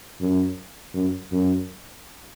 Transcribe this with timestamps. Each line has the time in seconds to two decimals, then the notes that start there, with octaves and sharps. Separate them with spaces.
0.21 F#2
0.94 F#2
1.32 F#2